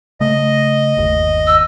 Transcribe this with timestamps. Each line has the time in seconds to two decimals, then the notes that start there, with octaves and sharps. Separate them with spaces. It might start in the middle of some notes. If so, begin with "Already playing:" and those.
0.20 C#3 A3 D#5
0.97 G1 D#2
1.47 E6